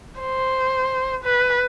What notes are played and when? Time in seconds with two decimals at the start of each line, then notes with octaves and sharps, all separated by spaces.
0.21 C5
1.24 B4